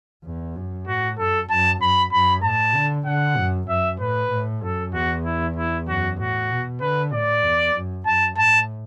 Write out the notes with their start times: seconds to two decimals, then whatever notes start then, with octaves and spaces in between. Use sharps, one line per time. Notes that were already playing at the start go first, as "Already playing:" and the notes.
0.24 E2
0.56 F#2
0.87 A2 F#4
1.19 F#2 A4
1.50 F#2 A5
1.81 F#2 B5
2.13 F#2 B5
2.44 A2 A5
2.75 D3
3.06 D3 F#5
3.37 F#2
3.68 F#2 E5
3.99 A2 B4
4.32 A2
4.62 F#2 A4
4.94 E2 F#4
5.25 E4
5.56 E4
5.87 F#2 F#4
6.19 A2 F#4
6.50 B2
6.81 D3 B4
7.12 A2 D5
7.44 E2
7.76 F#2
8.06 F#2 A5
8.38 A2 A5